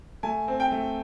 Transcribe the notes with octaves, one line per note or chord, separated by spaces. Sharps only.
A3 G#5
C4
G5
A3